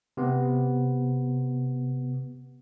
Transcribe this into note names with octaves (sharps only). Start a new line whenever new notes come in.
C3 B3